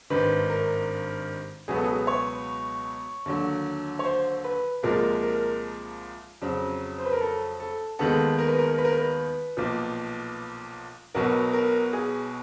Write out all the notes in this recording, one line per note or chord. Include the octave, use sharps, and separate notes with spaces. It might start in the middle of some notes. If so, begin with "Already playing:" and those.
G#1 G2 D#3 B4
A#4
C#2 B2 F#3 B3 G#4
A4
G#4
C#5
D#2 D3 F#3
C#5
C5
B4
C2 A#2 F3 G#3 A#4
A#4
F2 C#3 F#3
C5
B4
A#4
A4
A4
D#2 D#3 G#3 B3 A4
A#4
B4
A#4
B4
A#4
B4
B1 A#2 F3
B1 B2 F#3 B3 A#4
A#4
G#4